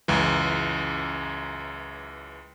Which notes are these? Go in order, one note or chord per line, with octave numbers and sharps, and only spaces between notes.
C#2 F#2 E3